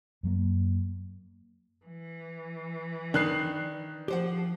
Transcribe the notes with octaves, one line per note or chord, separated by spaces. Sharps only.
F#2 F#3 A#3
E3
D#3 D4 B4 F#6 C7
F3 G4 C5 F#5